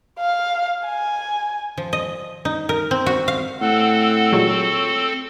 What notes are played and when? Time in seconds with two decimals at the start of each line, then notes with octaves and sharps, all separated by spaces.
0.20 F5
0.86 G#5
1.78 F3
1.93 D#5
2.45 D#4
2.69 A#4
2.91 C4
3.06 F#4
3.28 F5
3.61 A2 C4 A4 F#5
4.32 A#2 F#3 G#3 C#5